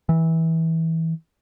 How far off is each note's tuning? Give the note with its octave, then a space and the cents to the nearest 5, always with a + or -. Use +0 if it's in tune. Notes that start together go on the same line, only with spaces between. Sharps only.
E3 -20